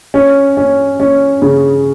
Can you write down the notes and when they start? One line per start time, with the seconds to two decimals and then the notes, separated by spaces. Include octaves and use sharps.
0.14 C#4
0.57 C#4
1.00 C#4
1.42 C#3